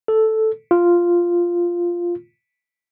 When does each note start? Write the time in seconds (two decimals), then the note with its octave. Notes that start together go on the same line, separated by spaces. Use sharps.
0.08 A4
0.71 F4